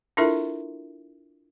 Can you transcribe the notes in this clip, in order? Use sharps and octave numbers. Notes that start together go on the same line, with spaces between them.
D4 E4 F4 A4 A#4 E5